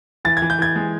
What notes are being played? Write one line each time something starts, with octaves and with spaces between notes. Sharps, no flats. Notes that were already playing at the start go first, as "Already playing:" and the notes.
E3 A6
G#6
E3
G6
E3 G#6
G#3